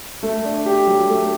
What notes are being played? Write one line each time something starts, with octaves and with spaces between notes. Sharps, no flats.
A3
D4
G4
F#3
A3